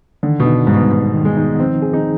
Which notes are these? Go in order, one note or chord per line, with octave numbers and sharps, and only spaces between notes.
D3 D#3
B2
D#4
G#2 G3
B2
B2 B3
D#3
G#3
D#4
F3 C4
G#4
D#4